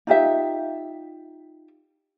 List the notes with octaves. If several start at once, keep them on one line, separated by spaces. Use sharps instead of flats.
D#4 F4 G4 E5